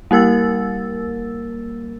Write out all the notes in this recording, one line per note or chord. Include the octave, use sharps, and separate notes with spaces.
G3 A#3 A#4 E6 A6